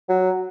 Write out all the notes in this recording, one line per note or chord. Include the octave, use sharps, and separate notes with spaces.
F#3